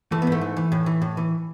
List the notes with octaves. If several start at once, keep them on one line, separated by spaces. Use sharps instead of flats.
E3 A3
B3
G#2
A3
E3
E3
A2
E3
A2
E3